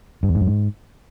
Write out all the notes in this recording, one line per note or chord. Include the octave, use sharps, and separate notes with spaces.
G2
E2
G#2
F#2
G#2